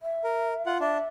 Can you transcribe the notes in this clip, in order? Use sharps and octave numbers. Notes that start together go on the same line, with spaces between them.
E5
A#4
F4 F#5
D4 E5